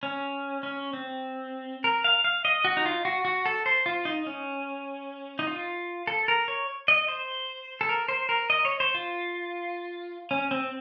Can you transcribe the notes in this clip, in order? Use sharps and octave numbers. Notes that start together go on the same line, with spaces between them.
C#4
C#4
C4
A#4
F5
F5
D#5
F#4
D#4
F4
F#4
F#4
A4
C5
F4
D#4
C#4
D#4
F4
A4
A#4
C#5
D#5
C5
A4
A#4
C5
A#4
D#5
C#5
C5
F4
C#4
C4